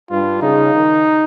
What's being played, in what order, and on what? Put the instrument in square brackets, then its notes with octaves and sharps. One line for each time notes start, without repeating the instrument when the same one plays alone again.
[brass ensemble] G2 [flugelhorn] F4
[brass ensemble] C#3 [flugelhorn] D#4
[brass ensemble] D#3